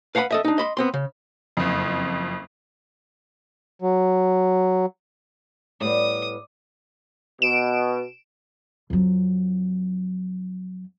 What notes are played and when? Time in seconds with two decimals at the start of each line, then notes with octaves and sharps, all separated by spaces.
0.15 B4 F5 F#5 A#5 B5
0.31 A4 D#5 E5
0.45 D4 D#4
0.58 D#5 B5 C6
0.77 B3 C4 C6
0.94 C#3
1.57 F#1 F2
3.82 F#3
5.81 A2 G3 B3 D5 D#6
7.42 B2 D7 E7
8.90 F2 F#3